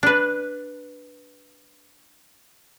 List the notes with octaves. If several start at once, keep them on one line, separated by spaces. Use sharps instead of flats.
D4 B4